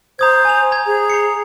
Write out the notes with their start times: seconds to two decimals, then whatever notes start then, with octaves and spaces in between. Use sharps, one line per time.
0.19 C5 A#5 D#6 G#6
0.45 G#5 A#5 F7
0.72 A#5 G#6
0.86 G#4
1.10 A#5 C7 C#7